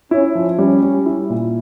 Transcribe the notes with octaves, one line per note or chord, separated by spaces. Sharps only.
C#4 E4
F3
G3 C#4
G3
E4
A#2